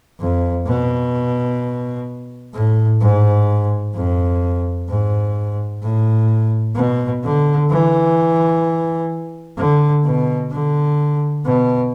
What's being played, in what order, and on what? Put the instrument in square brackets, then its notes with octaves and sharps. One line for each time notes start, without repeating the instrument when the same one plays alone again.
[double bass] F2
B2
A2
G#2
F2
G#2
A2
B2
D3
E3
D3
B2
D3
B2